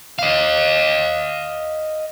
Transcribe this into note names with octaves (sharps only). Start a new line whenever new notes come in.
D#5 F5